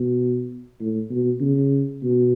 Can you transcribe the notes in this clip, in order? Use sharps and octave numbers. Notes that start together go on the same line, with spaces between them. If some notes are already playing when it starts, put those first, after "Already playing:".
Already playing: B2
A2
B2
C#3
B2